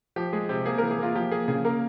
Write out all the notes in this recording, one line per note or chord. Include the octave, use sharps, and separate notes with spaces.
F3 G4
G#3 G#4
C3 G4
A#3 G#4
A#4
E3
G#4
A#3 F4
F3 G4
A#3 G#4
C#3 G#4
A#3 A#4